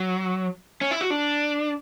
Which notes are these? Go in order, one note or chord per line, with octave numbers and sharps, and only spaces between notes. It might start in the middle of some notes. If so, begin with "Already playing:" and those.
Already playing: F#3
C#4
E4
F#4
D4